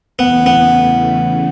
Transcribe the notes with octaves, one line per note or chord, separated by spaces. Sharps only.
E2 C#3 E3 A3 B3 C#4
B3